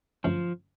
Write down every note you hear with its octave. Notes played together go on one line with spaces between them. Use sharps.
G2 D3 F3 F#3 A3 C#4